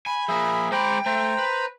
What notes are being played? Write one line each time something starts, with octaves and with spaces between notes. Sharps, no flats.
G#5 B5
F3 A#3 G#4 E5
G#3 C5 G5 A#5 B5 D6
A3 C5 A#5
B4